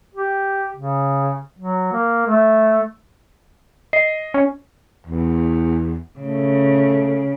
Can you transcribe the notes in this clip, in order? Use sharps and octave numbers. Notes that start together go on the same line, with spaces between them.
G4
C#3
F#3
A#3
A3
D#5 C7
C#4
E2
C#3 A3